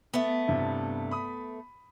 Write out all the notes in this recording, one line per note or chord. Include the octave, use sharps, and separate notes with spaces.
A3 B3
G2 C3 E4
B5 D#6